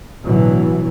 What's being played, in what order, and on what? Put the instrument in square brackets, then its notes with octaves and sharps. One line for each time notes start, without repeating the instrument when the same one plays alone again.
[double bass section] A1 B2 D3 E3 F#3